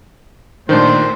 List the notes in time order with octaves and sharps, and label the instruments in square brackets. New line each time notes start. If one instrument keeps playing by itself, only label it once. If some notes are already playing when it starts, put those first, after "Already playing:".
[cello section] A#2 A3 [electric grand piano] D#3 D4 [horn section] C5